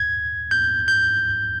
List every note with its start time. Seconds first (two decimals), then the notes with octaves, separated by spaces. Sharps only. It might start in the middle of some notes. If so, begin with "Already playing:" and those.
Already playing: G#6
0.51 G6
0.88 G6